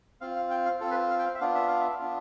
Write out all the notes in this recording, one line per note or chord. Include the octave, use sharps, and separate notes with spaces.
C4 F4 F5
F5
G5
F5
C4 F4 A4
B4
F5
G5
F5
E5
B3 D4 F4 F5
E5
F5
E5
B3 D4 F4